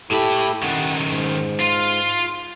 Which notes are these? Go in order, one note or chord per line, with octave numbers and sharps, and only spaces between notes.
A2 E4 G4 A4 B5
D#3 C#4 F#5
G#2
F4